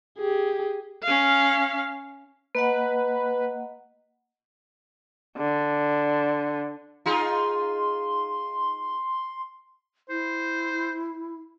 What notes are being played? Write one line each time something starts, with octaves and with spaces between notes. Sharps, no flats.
G4 G#4
C#4 F5
A#3 B4 D#5 F#5
D3
D#4 F4 G#4 C6
E4 C5